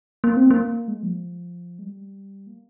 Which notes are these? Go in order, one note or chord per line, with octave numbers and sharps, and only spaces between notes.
A#3
C4
A#3
G#3
F3
G#3
G3
A#3